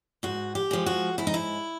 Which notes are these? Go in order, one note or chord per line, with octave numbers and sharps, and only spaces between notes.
G#2 F#4
G4
F3 G#3
F#4
G#2 E4
D#4
E4